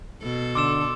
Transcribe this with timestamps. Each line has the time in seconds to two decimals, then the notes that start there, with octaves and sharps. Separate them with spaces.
0.21 B2 A4
0.55 D3 C6 D6 E6 E7